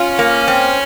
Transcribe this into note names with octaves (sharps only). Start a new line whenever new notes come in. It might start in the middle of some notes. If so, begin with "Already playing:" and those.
Already playing: C#4 F4
A#3
C4